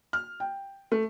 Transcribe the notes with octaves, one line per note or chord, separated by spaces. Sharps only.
F6
G5
A3